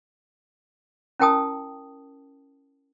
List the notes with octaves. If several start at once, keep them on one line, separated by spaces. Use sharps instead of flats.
C#4 E4 A#4 G5 A5 D#6